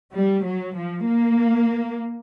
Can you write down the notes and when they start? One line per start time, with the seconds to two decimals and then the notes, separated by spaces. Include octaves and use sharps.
0.13 G3
0.44 F#3
0.75 F3
1.07 A#3